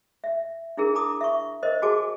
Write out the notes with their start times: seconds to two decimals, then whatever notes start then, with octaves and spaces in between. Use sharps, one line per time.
0.24 E5
0.77 D4 E4 G#4 A#4
0.95 A5 A#5 D6 D#6
1.21 E5 C#6
1.63 A#4 C5 D#5
1.82 F#4 G#4 G#5 A5 D6